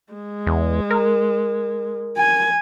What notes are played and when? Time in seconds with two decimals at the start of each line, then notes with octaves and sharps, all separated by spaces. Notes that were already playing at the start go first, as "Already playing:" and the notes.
0.13 G#3
0.46 E2
0.90 A#4
2.18 G#5